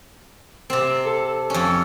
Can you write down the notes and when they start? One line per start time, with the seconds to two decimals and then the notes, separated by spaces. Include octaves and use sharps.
0.70 C3 C4
1.06 A4
1.50 F2 C#4